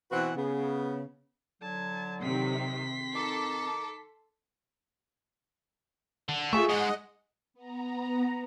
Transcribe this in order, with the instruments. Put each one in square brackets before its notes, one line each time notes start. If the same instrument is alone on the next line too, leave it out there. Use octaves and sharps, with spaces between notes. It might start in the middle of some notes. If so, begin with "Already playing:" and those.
[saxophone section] B2 E3 C4 F#4 B4 F#5
C#3 B3
[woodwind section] D3 F#3 [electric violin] A5 G#6
[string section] C3 D#3 [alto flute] C4 [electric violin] C6 B6
[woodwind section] D#3 D#4 D6 [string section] A4
[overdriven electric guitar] D3
[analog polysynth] A3 F4 [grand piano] G#4 C#6 [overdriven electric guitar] E5
[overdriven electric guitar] G#2 G#3 [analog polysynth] D#5 F#5
[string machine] B3 A#5